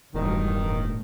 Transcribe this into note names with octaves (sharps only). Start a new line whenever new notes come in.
E1 A1 G2 D#3
A2